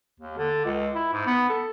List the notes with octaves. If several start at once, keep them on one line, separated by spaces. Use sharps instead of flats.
D#2
D3
C#2
E4
G#2
B3
A4